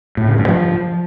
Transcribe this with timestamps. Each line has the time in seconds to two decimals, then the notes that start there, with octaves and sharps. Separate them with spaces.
0.17 A2
0.28 C#3
0.38 G2
0.48 F3